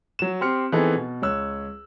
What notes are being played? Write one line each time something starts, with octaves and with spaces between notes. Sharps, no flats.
F#3 E7
C4 G4 C6 F6 C#7
E3 B3 C4 D#4 G#4 A4
B2
C#2 C#5 E6 F#6